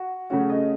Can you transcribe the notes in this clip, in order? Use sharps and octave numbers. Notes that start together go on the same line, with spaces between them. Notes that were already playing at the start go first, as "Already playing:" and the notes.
Already playing: F#4
C#3 A3 C#4 F#4
D#5